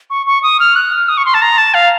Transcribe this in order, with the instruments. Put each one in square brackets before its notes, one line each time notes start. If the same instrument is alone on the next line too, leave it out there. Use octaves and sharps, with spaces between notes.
[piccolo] C#6
C#6
D#6
F6
F#6
F6
D#6
C#6
C6
A5
A#5
A5
F5